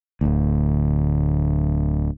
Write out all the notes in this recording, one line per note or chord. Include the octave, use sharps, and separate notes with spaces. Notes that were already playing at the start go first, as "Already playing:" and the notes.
D1 D2